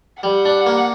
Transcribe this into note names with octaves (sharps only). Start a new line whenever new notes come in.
G3 F#5
D4
A#3